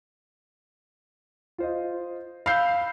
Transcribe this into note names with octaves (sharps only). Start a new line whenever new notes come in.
F4 C5 D#5
F5 B5 E6 G6 C7